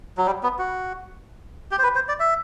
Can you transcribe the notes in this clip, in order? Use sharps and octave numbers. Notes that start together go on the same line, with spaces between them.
F#3
G3
B3
F#4
G4
C5
B4
C5
D5
E5